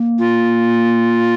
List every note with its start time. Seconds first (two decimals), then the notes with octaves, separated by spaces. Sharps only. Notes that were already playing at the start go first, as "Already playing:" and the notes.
Already playing: A#3
0.19 F4